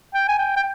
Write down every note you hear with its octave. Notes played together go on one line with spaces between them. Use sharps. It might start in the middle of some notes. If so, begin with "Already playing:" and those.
G5
G#5
G5
G5